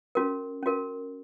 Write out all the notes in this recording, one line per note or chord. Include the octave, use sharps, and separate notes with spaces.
C#4 F#4 A#4
C#4 F#4 A#4